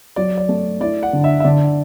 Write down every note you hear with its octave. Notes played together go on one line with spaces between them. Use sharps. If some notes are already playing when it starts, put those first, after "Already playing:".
F#3 D5
D5
A3
E4 D5
F#5
D3
E5
E5
D3 D5